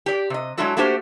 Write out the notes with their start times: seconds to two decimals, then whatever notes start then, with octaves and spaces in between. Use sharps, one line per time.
0.06 G4 D5
0.30 C3 D#5
0.57 F#3 G#3 D4 E4 F#4 A4
0.77 A3 A#3 D4 F#4 G4 C5